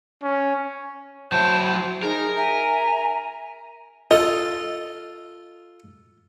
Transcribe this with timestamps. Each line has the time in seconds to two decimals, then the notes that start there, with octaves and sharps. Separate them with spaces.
0.23 C#4
1.32 F#3 E4 C5 A5 G6
1.60 C5
2.03 D#4 G#4 A#4
2.36 E5 G#5 A#5
4.11 F4 A4 D#5